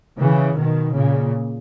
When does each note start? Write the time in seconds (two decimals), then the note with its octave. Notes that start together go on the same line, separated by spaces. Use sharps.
0.19 C#3 E3
0.57 B2 D#3
0.94 A#2 C#3